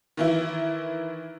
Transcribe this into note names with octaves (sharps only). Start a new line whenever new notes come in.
D#3 E3 E4